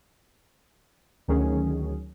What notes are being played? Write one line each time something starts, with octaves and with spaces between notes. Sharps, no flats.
D2 D#3 F#3 C#4 G#4